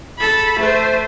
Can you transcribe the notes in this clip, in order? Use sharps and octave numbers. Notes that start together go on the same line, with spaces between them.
A4 B5
A3 C5